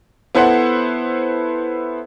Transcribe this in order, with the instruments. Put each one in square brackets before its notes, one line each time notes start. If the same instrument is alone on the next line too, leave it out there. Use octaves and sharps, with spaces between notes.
[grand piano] B3 E4 A4 C5 F#5